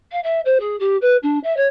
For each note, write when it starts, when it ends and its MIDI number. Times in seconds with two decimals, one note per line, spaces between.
0.12 0.19 77
0.23 0.40 76
0.45 0.58 72
0.60 0.76 68
0.79 0.96 67
1.01 1.16 71
1.23 1.39 62
1.43 1.55 76
1.56 1.67 73